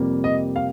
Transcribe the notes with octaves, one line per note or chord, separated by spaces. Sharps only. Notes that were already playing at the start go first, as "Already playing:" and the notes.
Already playing: F2 C3 G3 A#3
D#5
F5